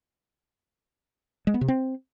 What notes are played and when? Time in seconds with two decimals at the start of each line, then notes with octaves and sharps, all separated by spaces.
1.47 G#3
1.54 B3
1.61 C3
1.68 C4